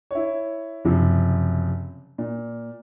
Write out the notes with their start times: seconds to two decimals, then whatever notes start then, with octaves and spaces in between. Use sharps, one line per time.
0.11 E4 C#5
0.85 F#1 C3 F3
2.18 A#2